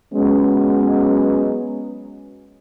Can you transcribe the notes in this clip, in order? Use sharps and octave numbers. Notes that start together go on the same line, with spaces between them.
F#3 G#3 B3 C#4